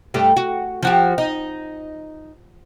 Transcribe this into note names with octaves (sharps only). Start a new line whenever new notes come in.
G2 A3 G4
F#4
F3 F#4 G4
D#4